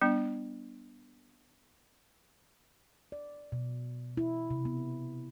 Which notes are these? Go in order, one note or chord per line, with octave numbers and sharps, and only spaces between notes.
G3 B3 D4
D5
B2
E4
C3
B3